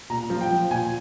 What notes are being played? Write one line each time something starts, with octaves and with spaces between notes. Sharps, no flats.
A#2 A#5
F3
G5
F3
A#2 G#5